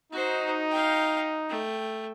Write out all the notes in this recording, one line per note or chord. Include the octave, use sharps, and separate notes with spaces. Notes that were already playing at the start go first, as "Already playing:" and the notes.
D#4 F#4 C5
F5 G5
A3 G5